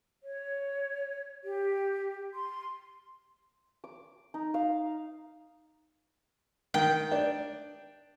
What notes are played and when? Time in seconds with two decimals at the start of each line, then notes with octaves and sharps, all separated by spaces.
0.23 C#5
1.44 G4
2.34 C6
3.84 D6
4.34 D#4
4.54 F5
6.74 D#3 G5
7.12 D4